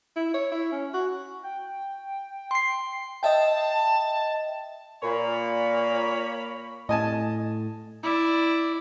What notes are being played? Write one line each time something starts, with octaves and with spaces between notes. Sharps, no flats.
E4
C#5
E4
C#4
F#4
G5
C6 C7
D#5 E5 G5 A5
A#2 A#3 C#5 B5
A2 D#5 G#5 A5
E4 D5